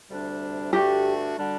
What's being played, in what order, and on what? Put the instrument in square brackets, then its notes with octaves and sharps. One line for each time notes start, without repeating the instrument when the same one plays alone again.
[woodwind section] D2 C3 G3 D4
[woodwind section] G2 D3 A3 D4 F#4 [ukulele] G4
[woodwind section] D3 G3 D4 F#4